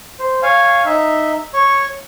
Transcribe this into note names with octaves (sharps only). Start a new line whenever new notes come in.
C5
C#5 F5 G#5
D#4 E5
C#5 C#6